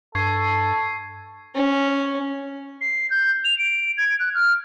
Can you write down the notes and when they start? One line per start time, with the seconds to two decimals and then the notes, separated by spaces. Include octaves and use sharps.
0.15 G2 A4 C#6 G#6 C7
1.55 C#4
2.81 C7
3.10 G6
3.45 F7
3.58 D7
3.97 G#6
4.20 F#6
4.35 F6